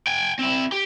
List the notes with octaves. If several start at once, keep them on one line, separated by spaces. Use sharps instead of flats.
G5 G#5
C4 E4
G4